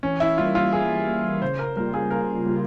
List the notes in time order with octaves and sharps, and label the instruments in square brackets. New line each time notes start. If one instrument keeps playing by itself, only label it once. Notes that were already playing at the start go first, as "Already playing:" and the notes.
[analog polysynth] E3 [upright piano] C#4
[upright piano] E4
[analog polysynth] G3 A#3 [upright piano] F4
[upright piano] F4
[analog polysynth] E3 [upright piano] G#4
[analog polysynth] G3 A#3
[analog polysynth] C#3 [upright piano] C5
[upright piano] A#4
[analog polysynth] G3 A#3 F4 [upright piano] A#4
[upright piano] G#4
[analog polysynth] C#3 [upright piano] A#4
[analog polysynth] G3 A#3 F4